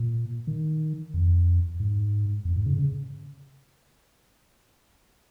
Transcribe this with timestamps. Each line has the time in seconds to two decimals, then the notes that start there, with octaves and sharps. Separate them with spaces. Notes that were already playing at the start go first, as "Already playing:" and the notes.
Already playing: A#2
0.47 D#3
1.14 F2
1.80 G#2
2.45 F2
2.56 G#2
2.66 C#3
2.78 C#3